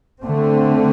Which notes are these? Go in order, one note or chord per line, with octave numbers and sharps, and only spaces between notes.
D3 A3 C4